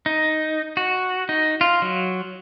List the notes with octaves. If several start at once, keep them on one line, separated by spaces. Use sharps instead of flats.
D#4
F#4
D#4
F4
F#3